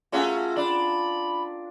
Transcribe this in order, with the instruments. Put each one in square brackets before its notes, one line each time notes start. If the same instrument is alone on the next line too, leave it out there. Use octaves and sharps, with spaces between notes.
[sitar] A3 C#4 F#4 [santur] F4 G#4 A#4
[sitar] D4 [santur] G5 [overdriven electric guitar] B5